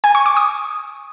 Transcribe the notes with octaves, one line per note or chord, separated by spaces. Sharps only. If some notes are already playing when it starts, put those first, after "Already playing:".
G#5
C#6
D6
D#6